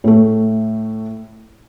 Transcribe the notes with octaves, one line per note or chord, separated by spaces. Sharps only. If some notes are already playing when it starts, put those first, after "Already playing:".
A2 A3